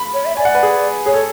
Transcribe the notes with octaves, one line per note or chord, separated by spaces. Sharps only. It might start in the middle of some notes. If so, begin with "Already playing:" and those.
Already playing: B5
C#5
E5
D5 G#5
F#5
B4
G#4
G#4 C#5
A4